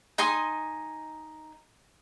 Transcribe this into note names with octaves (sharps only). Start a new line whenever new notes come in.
D#4 G#5 C6 D#6